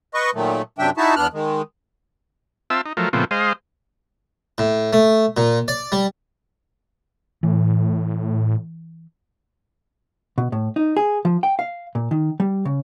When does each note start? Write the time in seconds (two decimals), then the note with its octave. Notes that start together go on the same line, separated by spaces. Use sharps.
0.14 B4 D#5 C#6
0.34 A#2 D#3 F#3 A3
0.78 F#2 C3 F#3 D4 E5 G5
0.97 D#4 E4 F#4 E5 A5
1.16 E2 B3 D4 F6 F#6
1.33 D#3 G#3
2.70 C4 F4 E5 A5 E6
2.86 D#4
2.97 F3 F#3 A3 A#4
3.13 A#2 C#3 F3 A3 B3 C4
3.31 G#3 C5 D#5 F5
4.58 A2
4.93 A3
5.37 A#2
5.68 D5
5.92 G3
7.43 A2 E3
10.38 B2
10.52 A2
10.76 D#4
10.97 G#4
11.25 F3
11.43 G5
11.59 F5
11.95 A#2
12.11 D#3
12.40 G3
12.65 C#3